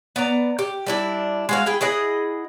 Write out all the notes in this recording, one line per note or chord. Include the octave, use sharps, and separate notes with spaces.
B3 D5 A#5
G4
G3 D4 E4
G#3 F#4 F5
E4 G#4 G5
E4 G#4 D#5 F#5